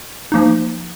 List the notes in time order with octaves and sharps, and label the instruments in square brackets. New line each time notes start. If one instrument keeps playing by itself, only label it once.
[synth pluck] F3 A#3 D#4